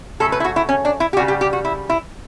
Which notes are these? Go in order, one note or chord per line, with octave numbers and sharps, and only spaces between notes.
C#3 F#3 A3 A4
B4
E4
F#4
E4
C#4
D4
E4
G4
C#3 G3 F#4
G4
G4
F#4
E4
E4